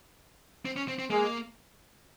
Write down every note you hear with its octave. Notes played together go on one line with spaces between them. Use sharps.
C4
C#4
C4
C4
G#3 A#3 G#4